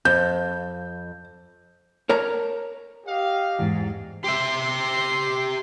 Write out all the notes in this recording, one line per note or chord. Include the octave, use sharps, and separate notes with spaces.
F2 G6
A#4 C#5 A5 A#5
G4 D#5 F5
E2 G#2
G4 E5 C6